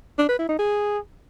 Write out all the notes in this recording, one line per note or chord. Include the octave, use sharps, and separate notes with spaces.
D4
B4
E4
D#4
G#4